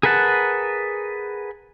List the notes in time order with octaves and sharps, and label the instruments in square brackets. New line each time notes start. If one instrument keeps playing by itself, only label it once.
[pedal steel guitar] G#4 A#4 B4 F#5 A5